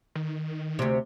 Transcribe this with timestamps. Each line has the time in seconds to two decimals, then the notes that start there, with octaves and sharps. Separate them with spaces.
0.15 D#3
0.79 D2 C3